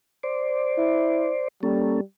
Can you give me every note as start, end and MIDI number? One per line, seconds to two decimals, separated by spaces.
0.23 1.48 72
0.23 1.48 74
0.78 1.31 64
1.63 2.01 55
1.63 2.00 58
1.63 2.00 61
1.63 2.00 69